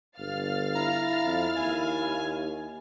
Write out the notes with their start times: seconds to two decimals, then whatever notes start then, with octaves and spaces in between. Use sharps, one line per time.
0.18 G1 F5 F6 A6
0.75 E4 A#5
1.24 F2
1.57 D#2 G#5